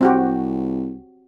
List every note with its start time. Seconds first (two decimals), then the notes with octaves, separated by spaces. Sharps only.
0.01 C2 C4 F#4 G4